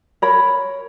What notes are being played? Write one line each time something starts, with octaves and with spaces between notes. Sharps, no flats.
A#4 C#5 B5